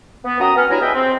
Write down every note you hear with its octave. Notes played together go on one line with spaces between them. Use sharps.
B3
F#2 F#4 G5 A#5 D#6
B3 C#4 F6
G2 F#3 E4 G#5 A#5
B3 G#4 B4 D#5 E5 G5
C4